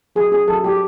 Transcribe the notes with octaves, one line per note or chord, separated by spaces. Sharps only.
F#3 G#4
C#4 G#4
F#3 A4
F#3 G4